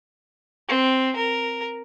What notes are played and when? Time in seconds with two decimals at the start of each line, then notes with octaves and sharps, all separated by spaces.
0.69 C4
1.16 A#4